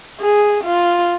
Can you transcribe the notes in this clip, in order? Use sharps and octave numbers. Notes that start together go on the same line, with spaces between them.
G#4
F4